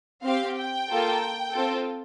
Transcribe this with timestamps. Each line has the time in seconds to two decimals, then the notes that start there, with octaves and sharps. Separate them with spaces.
0.24 C4 G4 F5
0.56 G5
0.89 A#3 F4 A4
1.52 C4 F4 A4